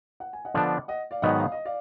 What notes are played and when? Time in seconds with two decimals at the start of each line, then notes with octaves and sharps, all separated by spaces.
0.20 F#5
0.33 G#5
0.45 D#5 F#5
0.54 D3 F3 B3 D4
0.88 D#5 F#5
1.11 D5 F5
1.22 G#2 D#3 F#3 B3 D#4 D#5 F#5
1.40 F5
1.52 D#5
1.65 D5 F5